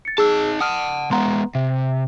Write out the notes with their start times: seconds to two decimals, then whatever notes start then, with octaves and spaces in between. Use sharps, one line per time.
0.05 A6 C#7
0.18 D#4 G#4 A5 E6
0.61 F#5 A5 D#6 F6
1.11 G#3 B3 F#5 A#5 C6
1.55 C3 E5